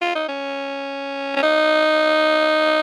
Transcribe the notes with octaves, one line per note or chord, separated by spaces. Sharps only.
F4
D#4
C#4
C#4
D#4